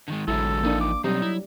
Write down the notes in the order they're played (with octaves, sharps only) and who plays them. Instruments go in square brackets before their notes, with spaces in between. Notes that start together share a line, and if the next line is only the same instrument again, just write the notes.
[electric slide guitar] D3 D#3 G#3
[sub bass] A1 [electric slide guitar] D3 F#3 G#3 [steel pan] E4 [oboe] A4
[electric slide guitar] F3 D#4 [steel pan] A#3 D4
[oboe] D6
[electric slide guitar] B2 C4 [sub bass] F#3 [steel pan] G3 [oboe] D#4
[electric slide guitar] E4